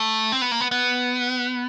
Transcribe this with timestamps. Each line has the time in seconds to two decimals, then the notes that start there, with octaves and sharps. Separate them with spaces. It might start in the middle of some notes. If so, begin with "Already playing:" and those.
Already playing: A3
0.32 C4
0.42 B3
0.51 A#3
0.61 B3
0.71 B3